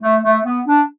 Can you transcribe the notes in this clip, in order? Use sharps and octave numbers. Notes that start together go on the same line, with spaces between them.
A3
A3
B3
D4